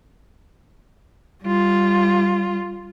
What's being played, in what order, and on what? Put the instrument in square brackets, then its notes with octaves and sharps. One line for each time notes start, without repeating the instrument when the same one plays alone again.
[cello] G3 F4